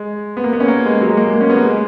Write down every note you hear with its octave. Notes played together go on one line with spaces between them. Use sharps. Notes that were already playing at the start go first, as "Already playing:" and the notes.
Already playing: G#3
B3
A#3
B3
C#4
A#3
G#3
F#3
G#3
A#3
G#3
A#3
C#4
B3
A#3
G#3